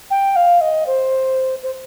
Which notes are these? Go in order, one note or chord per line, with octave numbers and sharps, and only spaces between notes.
G5
F5
D#5
C5
C5